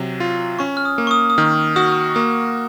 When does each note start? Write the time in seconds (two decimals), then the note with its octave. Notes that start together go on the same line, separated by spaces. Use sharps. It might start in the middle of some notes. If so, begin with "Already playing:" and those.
Already playing: C3 F#3
0.20 F4
0.59 C#4 C#6
0.77 F6
0.85 D#6
0.98 A#3
1.07 C#6
1.11 D#6
1.30 D#6
1.38 D#3 F6
1.76 F#4 D#6
2.15 A#3 D#6